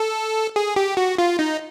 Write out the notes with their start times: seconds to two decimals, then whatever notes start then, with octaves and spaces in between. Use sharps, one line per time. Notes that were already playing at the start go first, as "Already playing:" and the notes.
Already playing: A4
0.56 G#4
0.76 G4
0.97 F#4
1.18 F4
1.39 D#4